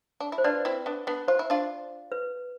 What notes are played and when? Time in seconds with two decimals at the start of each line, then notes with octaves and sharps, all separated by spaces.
0.20 D4
0.32 E4
0.38 C5
0.44 D4 F4 B4 D5
0.65 C4 E4
0.86 B3 D4
1.07 B3 D4
1.28 F4 C5
1.39 E4
1.50 D4 F4
2.12 B4